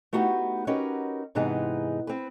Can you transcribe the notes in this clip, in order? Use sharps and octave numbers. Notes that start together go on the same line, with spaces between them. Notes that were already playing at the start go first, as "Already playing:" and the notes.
A3 B3 D#4 F#4 G4
C#4 D#4 F#4 G4 A#4 B4
G#2 C3 E3 B3 D#4 G#4
C4 B4